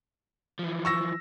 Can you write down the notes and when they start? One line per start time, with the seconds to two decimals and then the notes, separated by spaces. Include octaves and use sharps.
0.59 E3 F3
0.85 C#6 E6 A#6